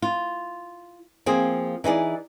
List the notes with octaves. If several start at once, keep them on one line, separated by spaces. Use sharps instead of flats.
F4
F3 A#3 C4 G#4
E3 D#4 G#4 D5